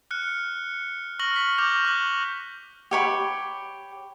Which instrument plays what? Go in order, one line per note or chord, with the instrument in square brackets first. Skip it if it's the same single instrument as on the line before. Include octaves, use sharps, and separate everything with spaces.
[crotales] F6 F#6 C#7
C#6 F6 A#6 F#7
B6
C#6 D6 F6 G6 F7
C#6 F#6 F#7
[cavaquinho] G4 C#5 B5